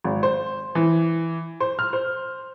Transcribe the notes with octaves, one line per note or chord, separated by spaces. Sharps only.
G#1
C5
E3
C5
F6
C5